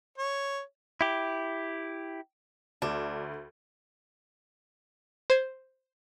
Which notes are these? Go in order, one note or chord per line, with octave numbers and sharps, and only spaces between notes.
C#5
E4 G4
D2 D4
C5 G#6